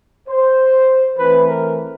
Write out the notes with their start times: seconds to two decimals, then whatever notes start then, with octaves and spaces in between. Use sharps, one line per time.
0.28 C5
1.17 E3 A3 C4 B4
1.48 A#4